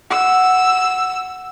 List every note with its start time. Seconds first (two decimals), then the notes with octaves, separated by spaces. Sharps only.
0.10 F#5 E6